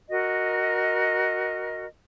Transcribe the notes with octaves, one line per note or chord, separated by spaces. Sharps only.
F#4 A#4 D#5